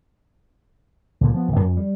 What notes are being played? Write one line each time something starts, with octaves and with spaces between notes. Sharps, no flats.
C#2 A#2 D3
F3 B3
D1 A1
F2
G3